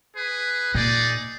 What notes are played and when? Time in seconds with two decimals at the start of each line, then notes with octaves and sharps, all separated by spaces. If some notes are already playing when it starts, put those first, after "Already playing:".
0.17 G#4 B4
0.75 A#2 D#4 G#4 D5